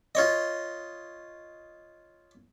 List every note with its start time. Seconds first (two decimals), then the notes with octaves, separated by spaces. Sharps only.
0.15 F4 C#5 D#5